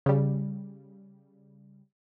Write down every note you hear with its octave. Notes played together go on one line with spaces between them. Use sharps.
C#3 G3